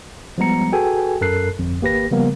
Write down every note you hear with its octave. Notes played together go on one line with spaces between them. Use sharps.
F3 G3 G#3 B3 A#5 C#7
F#4 G#4 A4 B4 G5 G#5
F#2 A4 A#4 F#6 C7
G1 F2
G#1 A#3 G4 B4 A#6
C#3 F3 G3 A#3 B3 A#4